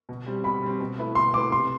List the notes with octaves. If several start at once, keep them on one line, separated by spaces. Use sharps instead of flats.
B2
G3 C4
B2 B5
G3 C4
B2
A3 E4 B4
B2 C6
A3 E4 B4 D6
C3 C6